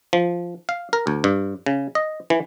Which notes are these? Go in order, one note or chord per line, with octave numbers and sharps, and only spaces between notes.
F3
F5
A#4
D2
G2
C#3
D#5
E3